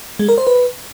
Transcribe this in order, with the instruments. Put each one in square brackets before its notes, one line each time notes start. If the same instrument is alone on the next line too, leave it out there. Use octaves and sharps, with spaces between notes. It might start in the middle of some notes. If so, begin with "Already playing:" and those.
[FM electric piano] G#3
A#4
C5
B4